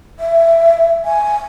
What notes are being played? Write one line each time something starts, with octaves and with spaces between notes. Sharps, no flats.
E5
G#5